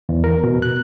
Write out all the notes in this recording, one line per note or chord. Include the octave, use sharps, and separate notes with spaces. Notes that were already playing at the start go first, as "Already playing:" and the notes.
E2
A#4
B2
F#6